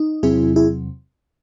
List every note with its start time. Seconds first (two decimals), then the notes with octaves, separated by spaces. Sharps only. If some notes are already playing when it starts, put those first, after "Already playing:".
Already playing: D#4
0.23 E2 C3 F#3 C4 E4 G#4
0.56 E4 G#4